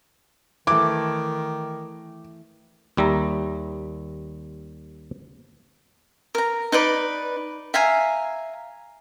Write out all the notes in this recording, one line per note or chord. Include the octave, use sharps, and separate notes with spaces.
D#3 E3 A3 D6
D#2 G3 E5 A#5
A#4 A#5
D#4 B4 D5 B5
E5 F5 G#5 A#5